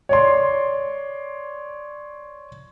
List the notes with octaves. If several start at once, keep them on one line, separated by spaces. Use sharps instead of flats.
C#5 D5 C6